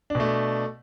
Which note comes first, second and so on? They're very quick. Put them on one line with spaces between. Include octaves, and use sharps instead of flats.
D4 B2 A3